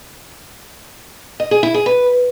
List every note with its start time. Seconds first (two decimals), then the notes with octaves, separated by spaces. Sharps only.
1.40 D#5
1.51 G#4
1.63 E4
1.74 G#4
1.86 B4